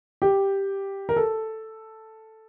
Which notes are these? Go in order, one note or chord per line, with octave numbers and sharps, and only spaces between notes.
G4
A#4
A4